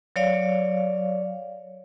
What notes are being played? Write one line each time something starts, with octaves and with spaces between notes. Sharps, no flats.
F#3 C#5 D5 F5